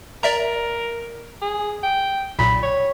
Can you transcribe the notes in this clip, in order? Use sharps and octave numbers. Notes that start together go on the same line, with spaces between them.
A#4 D5 E5 A#5
G#4
G5
B1 A#2 B5
C#5